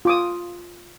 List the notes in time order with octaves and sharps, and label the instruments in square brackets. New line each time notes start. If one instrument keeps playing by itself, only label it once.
[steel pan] F4 D6 D#6